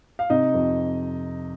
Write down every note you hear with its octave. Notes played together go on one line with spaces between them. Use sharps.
F5
C3 D#4 D#5
F2